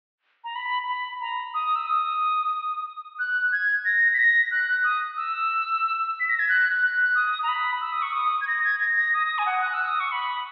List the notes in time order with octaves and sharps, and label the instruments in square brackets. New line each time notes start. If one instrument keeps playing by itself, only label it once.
[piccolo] A#5
B5
B5
A#5
D#6
E6
D#6
F#6
G#6
A#6
B6
A#6
F#6
D#6
E6
B6
A#6
G#6
F#6
F#6
D#6
A#5
B5
E6
D#6
C#6
D#6
G#6
A#6
G#6
A#6
A#6
D#6
G#5
F#5
F#6
E6
D#6
C#6
B5